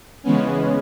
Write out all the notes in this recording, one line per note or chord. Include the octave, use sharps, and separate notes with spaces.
C#3 E3 G#3 B3 C#4